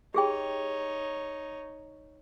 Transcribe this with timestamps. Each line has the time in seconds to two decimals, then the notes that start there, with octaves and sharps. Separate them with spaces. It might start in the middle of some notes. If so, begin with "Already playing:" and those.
0.14 D#4 G4 G#4 C#5 G5